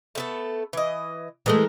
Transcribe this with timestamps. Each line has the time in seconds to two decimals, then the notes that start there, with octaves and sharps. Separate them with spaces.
0.15 A3 B3 A4
0.73 E3 D#5
1.46 E3 G#3 A3 A#4